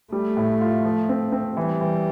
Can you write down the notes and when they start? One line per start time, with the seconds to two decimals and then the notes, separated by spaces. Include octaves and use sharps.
0.12 G3 A3
0.37 A2
0.61 F4
0.85 F3
1.09 C4
1.32 C4
1.57 E3 G3
1.81 E3